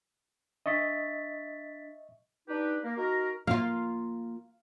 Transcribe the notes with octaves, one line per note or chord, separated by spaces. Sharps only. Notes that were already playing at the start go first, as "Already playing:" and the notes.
D4 D#5 E5 C#6 A6 B6
D4 D#4 G4 B4
A#3
D#4 F#4 A#4
A#3 F4 F5